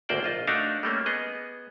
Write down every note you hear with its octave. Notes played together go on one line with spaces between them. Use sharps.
G#1 D2 A#3 C5 D5 G5
A#1 F4 D#5
A3 D4 D#4 F#4 F5
G3 A3 A#3 C#4
B3 G#4 D#5